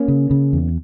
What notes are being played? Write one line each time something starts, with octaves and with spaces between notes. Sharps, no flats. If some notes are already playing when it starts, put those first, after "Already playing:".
Already playing: A#3 C#4
C#3
C#3
E2